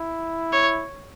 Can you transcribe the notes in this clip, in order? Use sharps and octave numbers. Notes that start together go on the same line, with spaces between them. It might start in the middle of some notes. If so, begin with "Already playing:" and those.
Already playing: E4
C#5